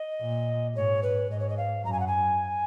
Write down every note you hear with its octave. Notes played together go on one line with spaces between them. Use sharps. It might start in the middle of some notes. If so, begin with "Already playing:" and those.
Already playing: D#5
A#2
G#2 C#5
B4
G#2 D#5
C#5
D#5
F5
F#2 A#5
G#5
F#5
G#5